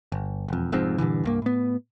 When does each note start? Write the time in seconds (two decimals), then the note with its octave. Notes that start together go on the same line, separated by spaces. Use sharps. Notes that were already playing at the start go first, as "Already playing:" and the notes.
0.12 G1
0.48 E1 F2
0.72 F1 F2 G#2 C4
0.98 G2 A#2 D3 E3
1.24 C2 G2 A#3
1.42 A2 B3